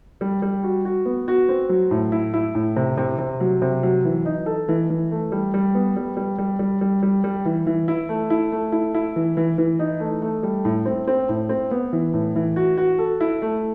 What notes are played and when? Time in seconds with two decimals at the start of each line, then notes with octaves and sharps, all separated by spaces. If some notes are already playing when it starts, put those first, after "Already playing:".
0.21 G3
0.42 G3
0.63 F#4
0.85 F#4
1.06 B3
1.28 F#4
1.49 C4
1.69 F#3
1.91 A2
2.12 E4
2.34 E4
2.55 A2
2.76 C3
2.97 C3
3.19 C3
3.40 F#3
3.62 C3
3.83 F#3
4.05 E3
4.26 D#4
4.46 A4
4.69 E3
4.90 E3
5.11 A3
5.32 G3
5.54 G3
5.75 B3
5.97 G3
6.17 G3
6.38 G3
6.59 G3
6.81 G3
7.03 G3
7.24 G3
7.45 E3
7.67 E3
7.88 E4
8.09 A3
8.30 E4
8.52 A3
8.72 E4
8.94 E4
9.16 E3
9.37 E3
9.58 E3
9.79 D#4
10.00 A3
10.22 A3
10.43 G3
10.65 A2
10.85 C4
11.08 C4
11.29 A2
11.49 C4
11.71 B3
11.93 E3
12.14 A2
12.36 E3
12.56 F#4
12.78 F#4
12.99 A4
13.21 E4
13.42 A3